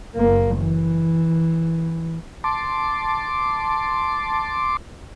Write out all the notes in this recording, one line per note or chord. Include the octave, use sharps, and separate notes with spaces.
F#1 A#3
E3
A5 C6 D6